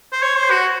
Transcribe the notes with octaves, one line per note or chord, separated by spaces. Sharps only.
C5
C#5
C5
F#4